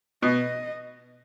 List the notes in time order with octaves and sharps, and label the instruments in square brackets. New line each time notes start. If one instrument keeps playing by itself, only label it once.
[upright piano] B2 [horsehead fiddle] D#5